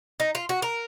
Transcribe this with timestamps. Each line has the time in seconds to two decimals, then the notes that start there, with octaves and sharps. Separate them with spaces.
0.20 D#4
0.35 F4
0.49 F#4
0.62 A#4